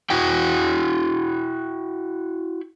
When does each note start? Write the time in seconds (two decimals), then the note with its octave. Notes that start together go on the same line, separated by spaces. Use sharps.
0.10 E4 F#4 G5